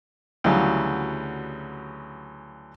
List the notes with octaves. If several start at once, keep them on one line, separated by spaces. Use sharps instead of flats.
D2 C#3 E3 F#3 G3